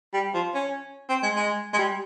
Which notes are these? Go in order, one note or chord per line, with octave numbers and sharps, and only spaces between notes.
G3
F3
C#4
C4
G#3
G#3
G#3
G3